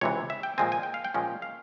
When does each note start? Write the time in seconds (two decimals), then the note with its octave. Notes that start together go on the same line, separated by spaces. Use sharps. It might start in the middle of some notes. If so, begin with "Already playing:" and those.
0.01 C#2 C3 E3 C#5
0.30 E5
0.43 G5
0.58 A#2 F3 G#3 C4 G#5
0.72 G#5
0.83 G5
0.94 F5
1.05 G5
1.14 A#2 F3 G#3 C#4
1.42 F5